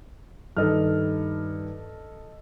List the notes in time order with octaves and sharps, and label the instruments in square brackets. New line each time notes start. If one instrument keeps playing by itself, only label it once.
[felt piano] G2 D#3 [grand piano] A4 D#5 F6